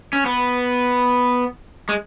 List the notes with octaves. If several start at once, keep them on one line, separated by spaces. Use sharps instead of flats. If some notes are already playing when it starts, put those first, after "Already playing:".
C#4
B3
G#3